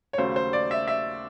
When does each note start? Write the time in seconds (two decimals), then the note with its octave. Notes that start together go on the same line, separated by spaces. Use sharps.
0.13 C#5
0.18 D#2 C#3 F#3 A3 C5
0.36 C5
0.53 D5
0.71 E5
0.88 E5